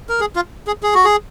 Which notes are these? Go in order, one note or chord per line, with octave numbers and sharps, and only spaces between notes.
A#4
G#4
F4
G#4
G#4
F#4
G#4